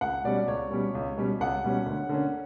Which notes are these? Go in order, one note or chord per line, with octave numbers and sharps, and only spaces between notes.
C#2 F#5
B2 G3 C#4 D5
C#2 C#5
B2 G3 C#4
C#2
B2 G3 C#4
C#2 F#5
B2 G3 C#4
D2
D3 A#3 C#4